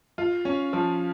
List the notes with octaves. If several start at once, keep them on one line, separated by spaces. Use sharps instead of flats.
F4
C#4
F3